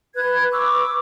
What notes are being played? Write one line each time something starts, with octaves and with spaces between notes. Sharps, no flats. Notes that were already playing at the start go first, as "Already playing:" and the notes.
B4 F#6 G#6
B4 C#6 D6 E6